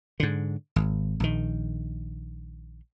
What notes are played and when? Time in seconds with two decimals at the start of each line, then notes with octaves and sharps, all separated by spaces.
0.20 G#2 D3
0.76 G#1
1.20 A#1 D#3